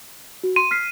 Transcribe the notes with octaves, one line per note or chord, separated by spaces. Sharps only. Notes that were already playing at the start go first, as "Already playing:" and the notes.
F#4
C6 D#7
F6 B6 C7